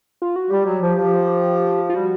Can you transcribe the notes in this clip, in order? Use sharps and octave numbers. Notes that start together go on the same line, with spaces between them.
F4
F#4
G3 G4
F#3
F3
F3
F4
G3 F#4